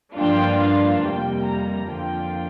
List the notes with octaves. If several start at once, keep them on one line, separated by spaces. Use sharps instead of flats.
G2 F3 A#3 D4 F4 G5
F5
F2 C3 G3 A#3 G5
A#5
F2 D3 F3 A#3 F4 G5